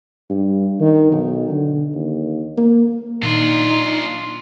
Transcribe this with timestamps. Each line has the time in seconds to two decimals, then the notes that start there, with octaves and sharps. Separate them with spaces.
0.30 G2
0.80 D#3
1.12 B1
1.50 D3
1.95 D#2
2.57 A#3
3.23 A#2 D#3 D4 D#4 F4